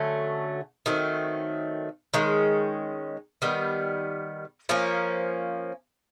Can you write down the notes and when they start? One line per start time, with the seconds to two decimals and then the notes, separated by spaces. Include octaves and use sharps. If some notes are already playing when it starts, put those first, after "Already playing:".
Already playing: D3 F#3 A3 C#4
0.86 D#3 F#3 A3 C4
2.14 D#3 G#3 C#4
3.42 D#3 G3 B3
4.69 F3 A#3 C#4